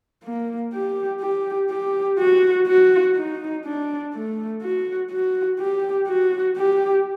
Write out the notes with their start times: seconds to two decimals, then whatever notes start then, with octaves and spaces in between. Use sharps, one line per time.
0.24 A#3
0.74 G4
1.21 G4
1.71 G4
2.19 F#4
2.67 F#4
3.16 D#4
3.65 D4
4.14 A3
4.62 F#4
5.11 F#4
5.59 G4
6.08 F#4
6.57 G4